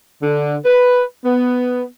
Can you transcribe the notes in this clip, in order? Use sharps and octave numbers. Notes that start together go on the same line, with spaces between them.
D3
B4
B3